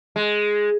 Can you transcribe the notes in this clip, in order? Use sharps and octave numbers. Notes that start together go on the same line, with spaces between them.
G#3